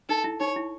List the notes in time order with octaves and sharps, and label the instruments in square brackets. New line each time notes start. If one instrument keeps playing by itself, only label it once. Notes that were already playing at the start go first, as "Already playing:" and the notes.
[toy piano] D#4 [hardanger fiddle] A4
[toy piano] E4
[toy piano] D#4 [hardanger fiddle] C#5
[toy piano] E4